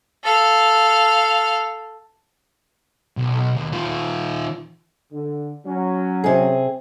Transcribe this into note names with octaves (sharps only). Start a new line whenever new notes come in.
A4 F5
B1
D#2
D#3 F4
D3
F#3 C#4
C3 G#4